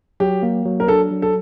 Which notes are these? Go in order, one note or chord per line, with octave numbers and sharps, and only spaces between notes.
F#3 G4
A#3
F#3
A#4
D4 A4
F#3
A4